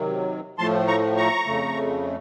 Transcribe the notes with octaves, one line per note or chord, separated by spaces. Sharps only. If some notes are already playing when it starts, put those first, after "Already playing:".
Already playing: C3 D#3 F#3
A2 F3 A3 A5 C6
A#5 C#6
A#5 C#6
F2 C#3 A3